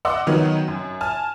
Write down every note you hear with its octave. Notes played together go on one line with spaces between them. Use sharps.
D5 D#5 F#5 C6 D6 E6
D#3 F#3 B3 D#4
F#2
G#5 A5 F6